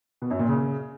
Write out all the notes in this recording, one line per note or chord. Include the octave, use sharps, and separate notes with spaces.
B2
F#2
A#2
C#3